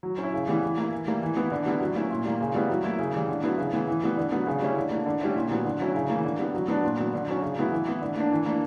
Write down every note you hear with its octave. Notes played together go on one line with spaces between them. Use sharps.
F#3
C#4 E4
C#3
E3 G3 B3
E3
A#3 E4
E3
G3 A#3 E4
E3
B3 E4
D3
G3 B3 E4
F#3
A#3 C#4 E4
A#2
G3 A#3
C#3
G3 B3 E4
F#3
A#3 E4
C#3
E3 G3
D3
F#3 B3 E4
C#3
E3 B3 E4
E3
G3 B3
D3
F#3 B3
C#3
G3 C#4 E4
D3
A#3 D4
D3
G3 C#4 E4
A#2
F#3 B3
D3
F#3 C#4 E4
C#3
E3 A#3
D3
G3 B3
F#3
B3 D4
A#2
F#3 B3
D3
F#3 C#4
C#3
F#3 B3 E4
E3
B3 E4
D3
A#3 D4
E3
A#3 D4